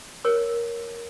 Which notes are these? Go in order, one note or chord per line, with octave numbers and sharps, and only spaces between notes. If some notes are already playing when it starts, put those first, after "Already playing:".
A#4 C#5